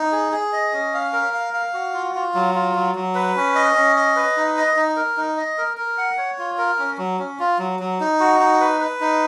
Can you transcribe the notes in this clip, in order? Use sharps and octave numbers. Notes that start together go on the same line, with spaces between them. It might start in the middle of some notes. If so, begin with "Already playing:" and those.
Already playing: D#4
G#4
G#4
D#5
C#4
F5
A#4
F5
F5
F#4
F4
F4
F#3
F4
F#3
F#3
B4
C#4
D#5
C#4
D#5
B4
D#4
D#5
D#4
A#4
D#4
D#5
A#4
A#4
F#5
C#5
F4
A#4
C#4
F#3
C#4
F4
F#3
F#3
D#4
F#4
D#4
B4
B4
D#4